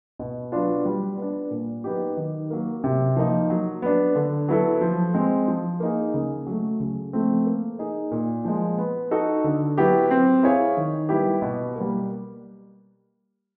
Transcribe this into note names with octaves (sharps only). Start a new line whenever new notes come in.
B2
F#3 B3 D4 F4
G3
B3 D4
A#2
F#3 B3 D#4 G4
D#3
F#3 A#3
C3
F3 A#3 D#4
F#3
B3 D4
D3
F#3 B3 E4 A4
F3
G#3 C4
F3
A#3 D#4 G#4
C#3
F#3 A3
C#3
F3 A3 C4
A#3
D#4 G#4
A#2
F3 G#3
B3
D#4 F#4 A4
D3
F#3 B3 E4 G4
C4
E4 G#4 C#5 F5
D#3
G3 B3 E4 G4
B2
G3 A#3